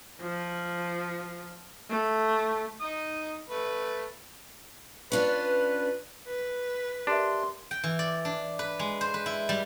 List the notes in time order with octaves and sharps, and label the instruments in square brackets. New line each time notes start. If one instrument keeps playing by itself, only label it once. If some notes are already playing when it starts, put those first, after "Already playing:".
[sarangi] F3
A3
[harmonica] D#4 D#6
A3 B4
[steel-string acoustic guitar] C#4 D4 F4 [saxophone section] B4
[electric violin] B4
[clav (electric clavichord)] D4 [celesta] G4 A#4 E5 [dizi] C6
[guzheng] G5
E3
D5
D4
B4
G#3
C5
B4
E4
G3